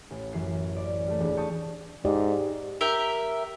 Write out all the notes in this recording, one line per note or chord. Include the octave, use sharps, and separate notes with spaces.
A1
F#2 E3 C7
D5
G3 A3
E1 D4
G5 A5 C#6 D#6 A6
G#2 G4 D5 D#5
G4 A#4 E5